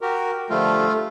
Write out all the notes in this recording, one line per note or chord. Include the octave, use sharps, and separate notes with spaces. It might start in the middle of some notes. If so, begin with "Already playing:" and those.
F#4 G4 A#4
D3 F3 G3 A3 F4